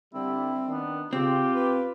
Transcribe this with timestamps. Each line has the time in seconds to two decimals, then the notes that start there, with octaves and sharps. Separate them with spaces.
0.14 D3 G3 C4 E4
0.67 D#3 B3 D4
1.13 C#3 C4 F4 G4
1.55 B4